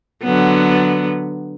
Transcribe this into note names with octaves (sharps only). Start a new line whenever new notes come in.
D3 F#3 B3